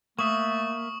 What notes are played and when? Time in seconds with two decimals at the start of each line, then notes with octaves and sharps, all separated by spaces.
0.19 A3 A#3 E5 C#6 D#6